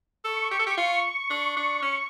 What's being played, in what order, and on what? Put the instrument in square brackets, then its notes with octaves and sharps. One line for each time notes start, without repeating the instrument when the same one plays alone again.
[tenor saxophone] A4 [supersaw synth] C#6
[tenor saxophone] G4
A4
G4
F4
D4
D4
C#4